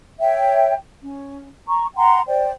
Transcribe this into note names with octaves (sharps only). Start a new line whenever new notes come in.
C#5 E5 G5
C#4
A#5 C#6
F#5 G5 A#5 C6
C5 D5 G5